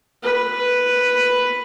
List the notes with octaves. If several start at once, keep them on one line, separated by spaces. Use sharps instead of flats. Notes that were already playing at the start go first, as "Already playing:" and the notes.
B4